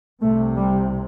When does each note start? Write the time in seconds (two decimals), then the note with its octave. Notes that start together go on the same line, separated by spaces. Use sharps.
0.22 C2 C3 A3
0.56 G3